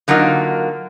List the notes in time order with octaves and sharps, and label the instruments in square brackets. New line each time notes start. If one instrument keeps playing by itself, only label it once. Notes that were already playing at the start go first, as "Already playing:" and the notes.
[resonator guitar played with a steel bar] D3 F#3 A#3 D#4 F4